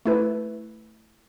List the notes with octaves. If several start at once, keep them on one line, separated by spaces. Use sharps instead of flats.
A3 E4 B4